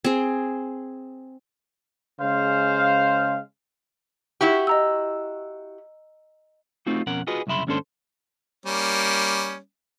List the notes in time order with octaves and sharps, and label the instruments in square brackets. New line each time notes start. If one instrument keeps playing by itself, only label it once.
[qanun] C4 G#4
[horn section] C#3 G#3 C5 F5
[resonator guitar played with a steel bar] E4 F#4 G4
[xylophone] D#5 A#5 E6
[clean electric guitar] A3 C4 D#4 F4 F#4
F2 B2 C#4 A#4 F#5
F4 F#4 G#4 B4 D#5
C2 F#2 C#3 E5 B5 C6
D#2 G#2 C#4 D4 A4 C5
[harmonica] G3 A#3 C#4